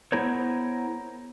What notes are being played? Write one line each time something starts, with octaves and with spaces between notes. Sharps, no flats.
B3 E4 G#4 A#4 C5 C#5